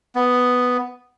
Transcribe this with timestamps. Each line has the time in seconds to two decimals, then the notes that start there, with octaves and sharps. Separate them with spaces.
0.15 B3